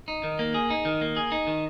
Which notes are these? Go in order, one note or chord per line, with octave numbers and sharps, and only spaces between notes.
D#4
D#3
A#3
G#4
D#4
D#3
A#3
G#4
D#4
D#3